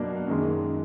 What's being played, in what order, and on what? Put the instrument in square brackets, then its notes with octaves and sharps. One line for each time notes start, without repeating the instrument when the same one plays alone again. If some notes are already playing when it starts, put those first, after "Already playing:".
Already playing: [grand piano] B2 F#3 A#3 D4
F#2 D#3 G#3